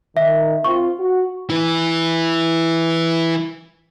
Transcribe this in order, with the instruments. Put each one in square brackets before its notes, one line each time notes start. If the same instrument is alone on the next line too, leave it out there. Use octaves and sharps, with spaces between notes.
[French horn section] D#3 [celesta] E5
[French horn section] C4 F4 [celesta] C#6
[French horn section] F#4
[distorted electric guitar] E3 E4